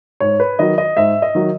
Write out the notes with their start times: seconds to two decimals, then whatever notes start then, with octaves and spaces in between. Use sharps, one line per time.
0.20 G#2 C#5
0.40 B4
0.59 D#3 F#3 D#5
0.78 D#5
0.97 G#2 E5
1.22 D#5
1.35 D#3 F#3